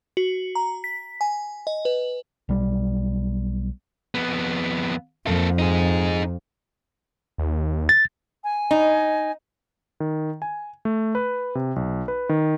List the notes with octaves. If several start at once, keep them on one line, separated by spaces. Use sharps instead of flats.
F#4
A#5
B6
G#5
D#5
B4
B1 G3
F2 B3
F2 A#3 A4
D#4 G#4
D#2
A6
G#5
D#4
D#3
G#5
A3
B4
C3
B1
B4
D#3